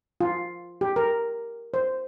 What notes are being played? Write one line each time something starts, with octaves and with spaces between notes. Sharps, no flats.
F4
G4
A#4
C5